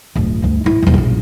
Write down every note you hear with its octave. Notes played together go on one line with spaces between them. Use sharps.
D1 G1
D2 G2
A1 E4
D#1 F#2
A#1 C#4